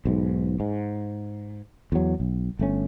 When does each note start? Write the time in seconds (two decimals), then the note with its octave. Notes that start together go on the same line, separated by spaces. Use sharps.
0.05 B1 G#2
0.60 G#2
1.92 E2 F#3
2.20 B1
2.59 G1 A3 C#4